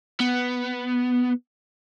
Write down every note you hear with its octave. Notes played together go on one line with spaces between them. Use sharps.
B3